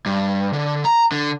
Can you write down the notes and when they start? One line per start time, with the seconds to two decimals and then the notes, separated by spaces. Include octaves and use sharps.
0.06 G2
0.53 D3
0.85 A#5
1.12 D3